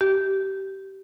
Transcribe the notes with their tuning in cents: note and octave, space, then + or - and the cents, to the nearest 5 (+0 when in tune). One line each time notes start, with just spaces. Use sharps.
G4 -20